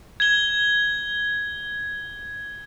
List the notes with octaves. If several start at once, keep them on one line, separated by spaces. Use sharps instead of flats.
G#6 G7